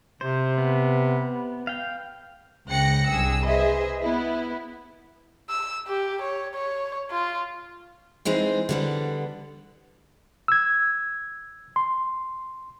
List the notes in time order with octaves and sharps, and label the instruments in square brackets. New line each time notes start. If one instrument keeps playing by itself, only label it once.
[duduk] C3 [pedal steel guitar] C5
[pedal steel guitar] B3
F5 G5
[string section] C#2 C#3 G5 F#6 A#6 C#7
C2 G2 G#4 E6
G#4 B4 C5 D#5 E5
B3 E4
[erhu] E6
G4
C#5
C#5
F4
[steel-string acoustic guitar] E3 G#3 C4 D#4
D3 G3 B3
[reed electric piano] E6 G#6
C6